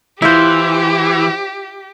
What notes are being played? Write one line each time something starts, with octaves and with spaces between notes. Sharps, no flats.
E3 E4 F4 G4 C5